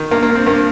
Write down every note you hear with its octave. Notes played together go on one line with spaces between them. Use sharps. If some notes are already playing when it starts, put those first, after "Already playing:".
Already playing: D#3
G2 A#3
A#3
G2
C4
G2 A#3